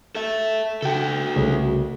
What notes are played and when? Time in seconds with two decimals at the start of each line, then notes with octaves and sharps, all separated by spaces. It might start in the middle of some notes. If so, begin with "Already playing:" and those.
0.15 A4 E5
0.82 C#3 F#4 A4 G5
1.36 C2 C#3 A3